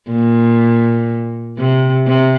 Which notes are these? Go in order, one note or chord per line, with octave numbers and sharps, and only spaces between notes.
A#2
C3
C3